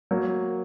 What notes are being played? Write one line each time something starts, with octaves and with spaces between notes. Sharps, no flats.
F#3 A#3